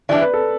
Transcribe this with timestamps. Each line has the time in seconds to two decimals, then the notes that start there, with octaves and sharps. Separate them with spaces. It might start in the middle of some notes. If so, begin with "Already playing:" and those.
0.09 E3 G3 D4 D5
0.21 B4
0.34 A4